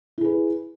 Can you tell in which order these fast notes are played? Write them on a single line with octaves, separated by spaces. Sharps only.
E4 G#4 B4